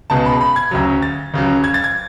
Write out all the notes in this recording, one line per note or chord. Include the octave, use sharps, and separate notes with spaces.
C#2 B2 G#3 A5
B5
B5
G#6
D2 C#3 F#3
A6
C#2 C#3 F#3
G#6
A6
G#6